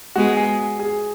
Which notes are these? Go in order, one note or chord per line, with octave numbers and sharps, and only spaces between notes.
G#3 B3 F#4
G#4
G#4